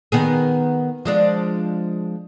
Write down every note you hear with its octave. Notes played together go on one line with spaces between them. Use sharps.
D#3 B3 G#4
F3 G#3 D4